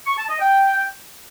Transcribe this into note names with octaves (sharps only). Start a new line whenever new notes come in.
C#6
A5
D#5
G5